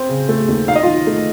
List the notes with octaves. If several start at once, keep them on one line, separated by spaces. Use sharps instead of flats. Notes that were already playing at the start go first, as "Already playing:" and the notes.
Already playing: C4
C#3
A3
D#2
D#4 F5
D#5
D#3 F4 F5
A3